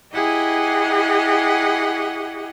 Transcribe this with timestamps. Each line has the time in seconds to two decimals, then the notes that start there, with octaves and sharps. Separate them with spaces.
0.13 E4 G4 G#4 D#5 F#5